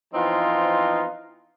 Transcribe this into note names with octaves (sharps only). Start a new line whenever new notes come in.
E3 F3 B3 C4 D#4 F4